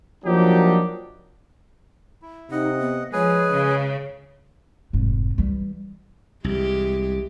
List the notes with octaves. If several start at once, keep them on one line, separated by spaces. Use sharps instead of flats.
F3 F#3 A#3 D4 D#4 G4
E4
C3 D#4 D#5 F#5
B3
F3 G#3 G#4 B4 C#5 G#5
C#3
F1 G#2
E3 G3
C2 E3 G#3 G4